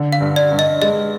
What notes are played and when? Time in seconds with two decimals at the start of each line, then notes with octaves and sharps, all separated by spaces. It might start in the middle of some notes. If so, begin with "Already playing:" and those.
Already playing: D3
0.12 F5
0.21 G2
0.36 D5
0.52 G2
0.59 D#5
0.82 G#3 D#5